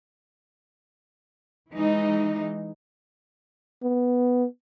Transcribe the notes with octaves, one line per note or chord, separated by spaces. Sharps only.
E3 G#3 D#4
B3